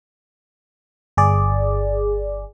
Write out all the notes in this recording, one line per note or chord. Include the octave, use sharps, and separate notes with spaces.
G1 G#4 D5